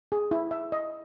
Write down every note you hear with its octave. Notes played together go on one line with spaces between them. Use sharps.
G#4
E4
E5
D#5